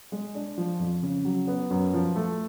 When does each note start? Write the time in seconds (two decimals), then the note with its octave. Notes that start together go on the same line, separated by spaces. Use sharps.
0.12 G#3
0.35 D4
0.58 F3
0.80 F2
1.03 C#3
1.25 F#3
1.47 B3
1.70 F#2
1.94 F3
2.16 A3